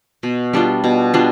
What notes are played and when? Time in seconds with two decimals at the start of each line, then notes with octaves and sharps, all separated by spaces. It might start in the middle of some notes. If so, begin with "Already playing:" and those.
0.23 B2
0.53 G3 D4 F4
0.84 B2
1.14 G3 D4 F4